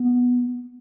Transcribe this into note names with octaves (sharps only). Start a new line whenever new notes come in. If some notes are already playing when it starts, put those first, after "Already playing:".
Already playing: B3